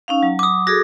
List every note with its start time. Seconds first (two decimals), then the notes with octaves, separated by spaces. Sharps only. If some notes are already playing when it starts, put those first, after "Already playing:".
0.08 C#4 D#4 F5
0.23 F#3
0.39 D6 D#6
0.67 F#4 G#4 A4 A#6